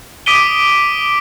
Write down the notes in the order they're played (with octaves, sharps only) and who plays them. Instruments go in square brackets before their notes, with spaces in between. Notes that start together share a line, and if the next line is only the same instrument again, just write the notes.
[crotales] D6 D#6 B6 D7 D#7 G7